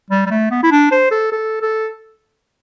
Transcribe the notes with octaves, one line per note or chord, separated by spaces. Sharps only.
G3
G3
A3
B3
E4
D4
C5
A4
A4
A4